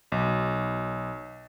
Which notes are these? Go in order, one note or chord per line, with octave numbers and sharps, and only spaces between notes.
B1